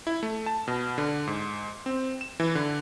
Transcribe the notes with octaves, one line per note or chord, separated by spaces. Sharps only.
E4
A3
A5
B2
D3
G#2
C4
E7
E3
D3